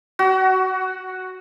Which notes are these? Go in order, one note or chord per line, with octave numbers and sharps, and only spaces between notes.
F#4